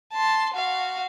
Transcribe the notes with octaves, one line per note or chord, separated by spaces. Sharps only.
A5 C6
F#4 F5